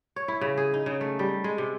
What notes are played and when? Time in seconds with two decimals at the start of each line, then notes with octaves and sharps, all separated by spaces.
0.16 C#5
0.28 E4
0.41 C#3
0.57 G#4
0.74 D#4
0.86 C#3
1.01 A3
1.19 G3
1.44 G#3
1.58 C3